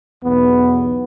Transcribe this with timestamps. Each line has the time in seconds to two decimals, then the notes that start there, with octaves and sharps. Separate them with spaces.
0.24 B1 E2 B3